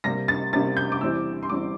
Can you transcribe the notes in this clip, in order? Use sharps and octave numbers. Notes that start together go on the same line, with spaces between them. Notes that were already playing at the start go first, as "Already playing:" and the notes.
C3 G3 A#3 A#6
A6
C3 G3 A#3 A6
G6
D6
E2 E3 G3 C4 E6
C6
E2 E3 G3 C4 D6